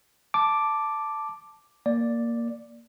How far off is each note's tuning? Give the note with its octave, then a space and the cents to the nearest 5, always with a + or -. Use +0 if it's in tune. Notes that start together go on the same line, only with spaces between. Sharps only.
A5 +0 D6 +0
A#3 +0 D5 +0